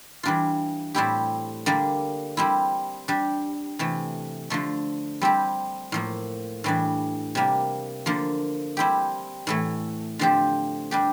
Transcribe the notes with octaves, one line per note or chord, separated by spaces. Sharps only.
E3 G3 D4 F4
A2 G3 C4 E4 G4
D3 G3 A#3 D4
G3 C4 E4
G3 D4 G4
C3 E3 A3
D3 F3 A3
G3 C4 E4 G4
A2 F3 A#3
A2 E3 G3 D4
C3 G3 A#3
D3 F3 A#3
G3 C4 E4 G4
A2 E3 A3
D3 F3 C4 G4
G3 D4 G4